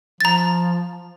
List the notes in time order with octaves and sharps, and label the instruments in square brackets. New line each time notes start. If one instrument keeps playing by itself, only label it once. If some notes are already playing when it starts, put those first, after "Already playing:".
[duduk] F3 [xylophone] A#5 A6